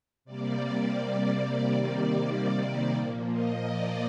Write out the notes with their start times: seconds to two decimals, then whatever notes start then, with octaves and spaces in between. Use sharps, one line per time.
0.25 C3 G3 A#3 D5
1.61 C3 D#3 G3 A#3 D5
2.97 A#2 F3 A#3
3.30 D#5
3.65 D5